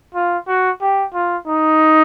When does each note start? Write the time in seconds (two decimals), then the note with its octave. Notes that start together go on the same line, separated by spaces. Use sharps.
0.14 F4
0.48 F#4
0.81 G4
1.14 F4
1.47 D#4